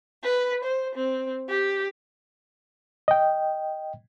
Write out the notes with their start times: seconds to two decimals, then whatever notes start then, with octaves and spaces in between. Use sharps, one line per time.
0.22 B4
0.62 C5
0.93 C4
1.47 G4
3.08 D#5 G5